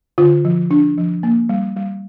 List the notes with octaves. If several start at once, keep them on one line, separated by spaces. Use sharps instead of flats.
D3 F4
F3
D4
F3
A#3
G3
G3